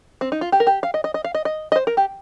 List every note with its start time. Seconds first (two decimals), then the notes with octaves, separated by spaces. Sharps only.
0.21 C4
0.32 D#4
0.41 F4
0.52 G4
0.60 A#4
0.67 G4
0.83 F5
0.94 D#5
1.04 D#5
1.14 D#5
1.24 F5
1.35 D#5
1.45 D#5
1.72 D#5
1.76 C5
1.87 A#4
1.97 G4